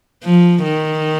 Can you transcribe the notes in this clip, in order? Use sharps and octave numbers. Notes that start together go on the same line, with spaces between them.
F3
D#3